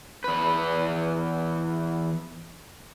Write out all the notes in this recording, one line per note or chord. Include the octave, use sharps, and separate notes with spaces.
E2 B4